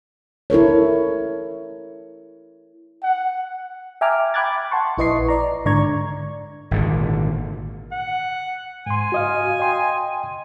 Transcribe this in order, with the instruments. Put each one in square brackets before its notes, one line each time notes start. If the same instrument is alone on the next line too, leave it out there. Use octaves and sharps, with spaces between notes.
[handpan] E4 A4 A#4 C#5
[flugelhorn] F#5
[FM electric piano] E5 G5 G#5 A#5 D6 F6
G5 B5 D6 F#6 G#6 A6
F#5 A5 C6 C#6
A#1 E4 B4 D#5 C#6 C7
D5 A#5
G#2 D3 D5 A#5 C#6 G#6
[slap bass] G#1 A#2 D3
[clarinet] F#5
[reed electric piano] G#2 C6 [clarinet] G#5
[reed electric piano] F#4 D#5 F5
D#5 G5 C6